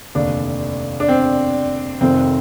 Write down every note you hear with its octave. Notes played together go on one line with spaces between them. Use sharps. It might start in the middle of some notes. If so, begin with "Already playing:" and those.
F1 D#2 D3 D4
D4
C4
F1 F2 D#3 C4